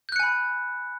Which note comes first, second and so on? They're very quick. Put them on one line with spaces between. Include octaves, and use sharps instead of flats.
G6 F#6 C#7 G#5 B5